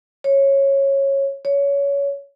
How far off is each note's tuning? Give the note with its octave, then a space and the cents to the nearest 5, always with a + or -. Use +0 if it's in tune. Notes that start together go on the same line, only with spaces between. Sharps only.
C#5 -15
C#5 +20